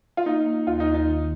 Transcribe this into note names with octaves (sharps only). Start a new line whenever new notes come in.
F4
A#3 D#4
A#3
D#2 F4
D#4
D#2
D#4
D#3